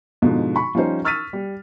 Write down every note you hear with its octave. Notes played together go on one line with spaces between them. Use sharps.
G#2 B2 D3 F3
B5 C#6
F3 G3 C#4 D#4 C5
C#6 E6 F6 A6 B6 D#7
G3